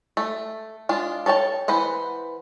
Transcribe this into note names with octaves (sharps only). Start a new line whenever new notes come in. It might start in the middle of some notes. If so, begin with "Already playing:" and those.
A3
G#3 D4 F4
A4 C#5 G5 A5
E3 B4 C5 F#5